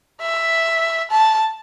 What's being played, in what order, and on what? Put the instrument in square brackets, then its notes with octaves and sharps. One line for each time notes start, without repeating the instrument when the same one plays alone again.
[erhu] E5
A5